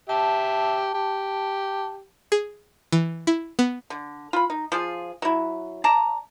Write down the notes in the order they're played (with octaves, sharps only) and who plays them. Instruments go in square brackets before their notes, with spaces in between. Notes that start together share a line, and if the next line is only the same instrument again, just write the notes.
[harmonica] G4 E5 [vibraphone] A5
[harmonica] G4
[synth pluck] G#4
E3
E4
B3
[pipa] D3
F4 B5
D#4
F3 F4 G#4
F#3 E4
D5 A5 A#5